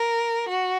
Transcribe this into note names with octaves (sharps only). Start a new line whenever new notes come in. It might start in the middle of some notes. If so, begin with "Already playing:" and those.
Already playing: A#4
F#4